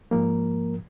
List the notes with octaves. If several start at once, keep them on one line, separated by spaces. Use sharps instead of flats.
G#2 F3 A#3 A#4